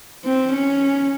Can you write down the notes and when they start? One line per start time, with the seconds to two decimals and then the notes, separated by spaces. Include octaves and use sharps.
0.25 C4
0.53 C#4